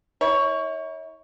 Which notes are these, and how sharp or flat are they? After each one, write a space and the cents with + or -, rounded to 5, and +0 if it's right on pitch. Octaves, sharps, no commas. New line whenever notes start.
E4 -45 C#5 +5